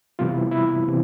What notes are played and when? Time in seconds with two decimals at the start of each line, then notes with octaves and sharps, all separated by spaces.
0.19 C3 E3 G3 B3 F4
0.30 E4
0.51 E4
0.88 C3 E3